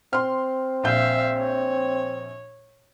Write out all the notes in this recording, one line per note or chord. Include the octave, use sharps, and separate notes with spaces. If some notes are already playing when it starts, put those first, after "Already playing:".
C4 C6 F6
A#1 E5 F5 G6
C#5